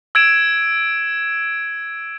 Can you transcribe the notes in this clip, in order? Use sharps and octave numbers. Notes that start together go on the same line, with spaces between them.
E6 G#6 D7 E7